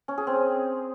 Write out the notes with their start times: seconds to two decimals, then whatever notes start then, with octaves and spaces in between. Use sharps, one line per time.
0.08 C#4
0.18 G#4
0.27 C4